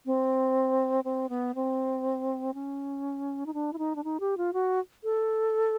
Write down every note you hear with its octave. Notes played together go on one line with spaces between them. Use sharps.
C4
C4
B3
C4
C#4
D#4
D4
E4
D#4
D4
D#4
G4
F4
F#4
A4